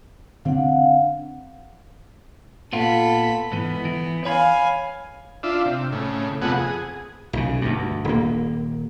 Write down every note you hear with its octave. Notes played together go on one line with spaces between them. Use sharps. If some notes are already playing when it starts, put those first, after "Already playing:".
D3 C4 D4 F5 F#5
A#2 B3 F4 A4 B5
G#2 E3 B3
E3
C#5 F5 G#5 B5
D4 F4 E5
C3
A2 C#3
F2 C3 A3 B3 G#4 F#5
G#4
B1 C#3
D2 G2
D#1 A#3